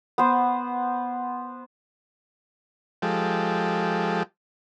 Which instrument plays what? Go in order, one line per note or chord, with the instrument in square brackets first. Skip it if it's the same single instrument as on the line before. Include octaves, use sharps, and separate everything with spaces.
[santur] B3 C5
[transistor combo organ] F3 G#3 G4 A4